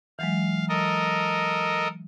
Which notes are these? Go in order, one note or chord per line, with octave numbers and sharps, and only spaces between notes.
E3 F#3 G#3 F5
A4 A#4 D#5